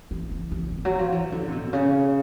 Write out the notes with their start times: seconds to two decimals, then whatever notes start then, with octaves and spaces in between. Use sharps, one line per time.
0.11 E3
0.32 E3
0.52 E3
0.72 E3
0.85 F#3
0.99 F3
1.12 E3
1.32 D3
1.48 C3
1.52 B2
1.73 C#3